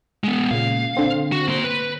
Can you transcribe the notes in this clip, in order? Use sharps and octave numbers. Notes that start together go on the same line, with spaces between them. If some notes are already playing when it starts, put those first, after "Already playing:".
G#3 B3
A#2 C#3 F5
D3 C4
F#4
A#3 C6
B4